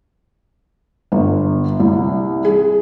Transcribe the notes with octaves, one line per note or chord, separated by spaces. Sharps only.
G1
C2
G#4